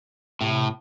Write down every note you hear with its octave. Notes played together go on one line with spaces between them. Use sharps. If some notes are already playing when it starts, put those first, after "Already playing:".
A2 C3